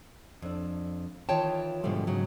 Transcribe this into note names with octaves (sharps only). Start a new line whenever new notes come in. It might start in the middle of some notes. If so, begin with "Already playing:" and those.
F2 D4
D#3 E3 F4 C#5 G5 A5
G#2 B2 D3 F3 G3 A3
G#2 C#3 F#3